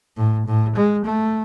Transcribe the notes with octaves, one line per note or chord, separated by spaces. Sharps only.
A2
A2
G#3
A3